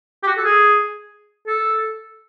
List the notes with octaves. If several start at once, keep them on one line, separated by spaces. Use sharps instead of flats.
G4
F#4
A4
G#4
A4